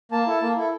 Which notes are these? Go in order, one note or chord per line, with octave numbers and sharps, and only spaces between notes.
A#3 A5
E4 A4
A#3
E4 A4